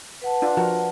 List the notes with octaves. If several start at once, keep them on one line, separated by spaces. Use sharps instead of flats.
B4 F#5 A5
D4 F4
F3 F#4 A#4